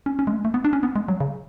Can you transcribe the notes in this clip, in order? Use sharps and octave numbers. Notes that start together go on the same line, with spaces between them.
C#4
C#4
G#3
A3
A3
B3
D4
C#4
B3
G#3
F#3
C#3